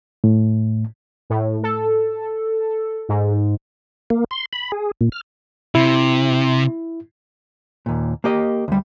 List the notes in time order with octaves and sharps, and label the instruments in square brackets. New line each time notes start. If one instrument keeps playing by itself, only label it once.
[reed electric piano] A2
[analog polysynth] A2
A4
G#2
[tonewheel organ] A#3
C6
B5
G#4
A#2
F6
[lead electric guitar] C3 [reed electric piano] E4
[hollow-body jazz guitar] D#2 A#2
A#3 G4 D#5
D2 G3